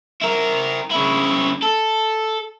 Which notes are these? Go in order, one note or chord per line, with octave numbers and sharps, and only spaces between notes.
E4 A#4
C#3 E4
A4